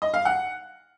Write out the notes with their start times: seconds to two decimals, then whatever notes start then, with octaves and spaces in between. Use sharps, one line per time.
0.02 D#5
0.14 F5
0.25 F#5